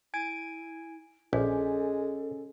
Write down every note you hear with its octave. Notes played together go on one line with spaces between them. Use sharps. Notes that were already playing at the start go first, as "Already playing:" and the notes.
E4 G#5 G#6 D7
A#1 G#3 C#4 A4